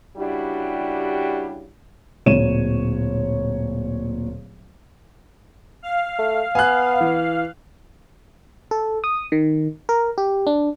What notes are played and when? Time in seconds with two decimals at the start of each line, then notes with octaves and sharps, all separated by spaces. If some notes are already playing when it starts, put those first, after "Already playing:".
0.17 C#3 G3 D4 E4 F#4 G4
2.26 D1 A#2 C#5 D#7 E7
5.82 F5
6.19 A3
6.55 B3 G#5 F#6
7.01 E3
8.71 A4
9.04 D#6
9.32 D#3
9.89 A#4
10.18 G4
10.47 D4